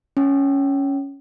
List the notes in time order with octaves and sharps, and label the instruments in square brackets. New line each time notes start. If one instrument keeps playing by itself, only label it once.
[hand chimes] C#4